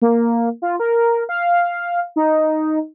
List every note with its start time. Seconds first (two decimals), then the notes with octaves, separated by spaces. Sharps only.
0.02 A#3
0.62 F4
0.80 A#4
1.29 F5
2.16 D#4